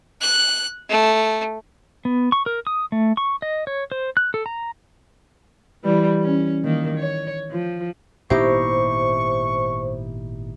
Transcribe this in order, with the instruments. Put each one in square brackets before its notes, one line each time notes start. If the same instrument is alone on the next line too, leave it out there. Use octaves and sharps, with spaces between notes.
[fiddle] F#6
A3
[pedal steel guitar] B3
C#6
A#4
D#6
A3
C#6
D#5
C#5
C5
F#6
A4
A#5
[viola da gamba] E3 G3
C#4
D#3 A#3
C#5
F3
[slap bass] G#1 A#2 B3 [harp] D#4 E4 G4 [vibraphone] C5 [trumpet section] C#6